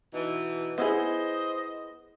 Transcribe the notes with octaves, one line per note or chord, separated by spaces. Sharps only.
B2 E3 D#4
B3 E4 G#4 C5 D#5